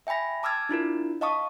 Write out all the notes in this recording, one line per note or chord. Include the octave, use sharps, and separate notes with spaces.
E5 G5 G#5 B5 A#6
A5 D6 E6 F6 G#6 A6
D4 E4 F4 A#4
D#5 F5 A5 C#6 D#6